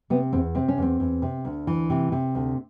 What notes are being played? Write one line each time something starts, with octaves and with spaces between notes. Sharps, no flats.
C3 B3
E2 C4
C3 C4
C#4
E2 C4
E2
C3
D2
E3
C3
C3
D2